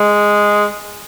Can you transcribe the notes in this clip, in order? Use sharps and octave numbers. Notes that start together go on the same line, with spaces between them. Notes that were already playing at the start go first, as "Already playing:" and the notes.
Already playing: G#3